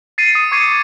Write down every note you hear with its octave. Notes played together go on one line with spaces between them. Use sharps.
A6 C7 C#7 D#7
D#6
C#6 D6 G#6 C7 C#7 D#7